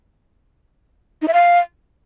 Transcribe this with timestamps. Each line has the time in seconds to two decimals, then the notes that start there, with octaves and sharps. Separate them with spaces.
1.22 D#4
1.28 E5
1.34 F5